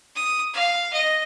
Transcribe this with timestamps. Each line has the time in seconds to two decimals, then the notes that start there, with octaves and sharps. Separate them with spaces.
0.16 D#6
0.53 F5
0.93 D#5